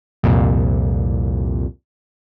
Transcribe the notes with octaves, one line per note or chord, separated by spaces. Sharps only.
C2 F2 A#2